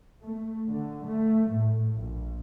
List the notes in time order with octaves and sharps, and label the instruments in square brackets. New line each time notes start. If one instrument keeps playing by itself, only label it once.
[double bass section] A3
D3
A3
A2
A#1